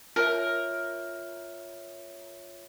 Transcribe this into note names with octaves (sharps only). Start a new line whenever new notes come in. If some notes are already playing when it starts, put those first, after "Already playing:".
F4 A#4 C#5 E5